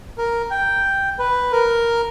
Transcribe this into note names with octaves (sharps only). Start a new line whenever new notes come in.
A#4
G5
B4
A#4